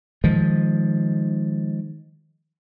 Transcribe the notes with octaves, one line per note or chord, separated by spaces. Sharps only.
D#3 F3 G#3